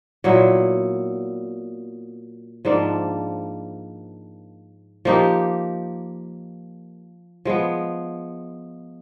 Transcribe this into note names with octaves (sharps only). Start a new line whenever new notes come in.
A#2 F#3 B3 E4
G#2 F3 A#3 D4
F3 A#3 D#4 G4
F3 G#3 B3